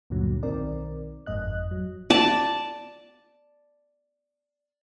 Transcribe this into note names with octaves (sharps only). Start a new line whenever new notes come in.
D2 G2 A#2 D3 F#3
B1 D#3 C4 A#4 D5
G1 F2 G#2 D#5 F#6
F#3
D5 A5